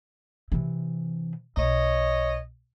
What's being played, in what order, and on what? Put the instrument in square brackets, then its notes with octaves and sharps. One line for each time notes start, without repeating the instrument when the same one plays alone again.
[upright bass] C3 E3
[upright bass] B1 [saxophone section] C#5 D#5